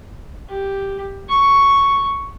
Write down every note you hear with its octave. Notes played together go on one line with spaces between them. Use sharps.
G4
C#6